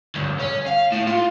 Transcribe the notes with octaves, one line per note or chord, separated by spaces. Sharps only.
D2 G2
C#4
F5
A2
F4